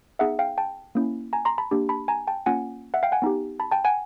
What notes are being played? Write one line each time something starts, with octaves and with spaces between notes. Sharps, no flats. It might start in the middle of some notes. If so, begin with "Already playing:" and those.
B3 D#4 G#4 E5 F#5
F5 G5
G5 A5
A#3 C#4 E4
G#5 A#5
A#5 C6
A5 B5
A#3 D4 G4
A5 B5
G#5 A#5
G5 A5
A#3 C#4 F4 F#5 G#5
E5 F#5
F5 G5
F#5 G#5
B3 D#4 G4
A5 B5
G5 A5
F#5 G#5